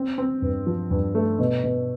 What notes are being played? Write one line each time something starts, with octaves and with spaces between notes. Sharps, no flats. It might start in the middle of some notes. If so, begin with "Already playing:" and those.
Already playing: C4
C4
G2
F3
G2
A3
B2
B2